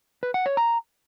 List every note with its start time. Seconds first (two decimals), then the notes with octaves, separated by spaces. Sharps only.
0.23 B4
0.34 F#5
0.46 C#5
0.57 A#5